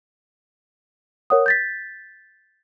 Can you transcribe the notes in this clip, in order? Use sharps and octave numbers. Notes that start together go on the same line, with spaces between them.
A#4 C#5 F#5 D#6
G6 A6 B6